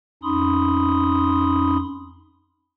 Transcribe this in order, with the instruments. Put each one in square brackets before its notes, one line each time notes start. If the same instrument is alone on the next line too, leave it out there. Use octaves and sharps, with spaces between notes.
[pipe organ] F2 C#4 D#4 B5 C6 D#6